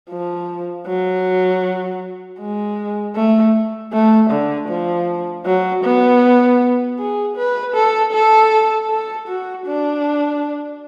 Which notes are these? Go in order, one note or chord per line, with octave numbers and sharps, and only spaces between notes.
F3
F#3
G#3
A3
A3
D3
F3
F#3
B3
G#4
B4
A4
A4
A4
F#4
D4